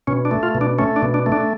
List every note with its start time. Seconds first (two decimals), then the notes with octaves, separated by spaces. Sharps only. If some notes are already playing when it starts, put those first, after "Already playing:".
0.07 B2 C#4
0.25 D4
0.31 A3
0.43 F4
0.55 B2
0.61 D4
0.78 A3 C#4
0.96 D4
1.02 B2
1.14 D4
1.26 A3
1.32 D4